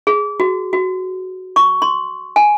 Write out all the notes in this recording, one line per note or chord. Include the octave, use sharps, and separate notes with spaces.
G#4
F#4
F#4
C#6
C6
G#5